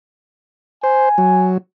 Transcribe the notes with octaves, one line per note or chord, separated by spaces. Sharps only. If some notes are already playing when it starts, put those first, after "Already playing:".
C5 G#5
F#3